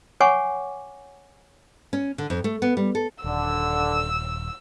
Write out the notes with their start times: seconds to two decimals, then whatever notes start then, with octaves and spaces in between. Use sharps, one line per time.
0.20 C#5 F#5 G#5 C#6 D6
1.93 C#4
2.18 D3
2.30 F2
2.44 A3
2.62 B3
2.77 G3
2.95 A4
3.24 D#1 D3 E6